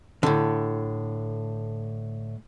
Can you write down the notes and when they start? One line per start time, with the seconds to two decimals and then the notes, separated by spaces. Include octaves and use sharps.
0.23 A2 D3